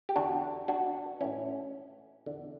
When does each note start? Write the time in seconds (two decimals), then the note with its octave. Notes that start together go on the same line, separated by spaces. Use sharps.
0.09 G4
0.16 E2 D3 D4 F#4
0.68 D4 F#4
1.21 A2 E3 C#4 E4
2.26 E2 D3